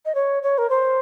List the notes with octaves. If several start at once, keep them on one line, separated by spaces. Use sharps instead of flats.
D#5
C#5
C#5
A#4
C5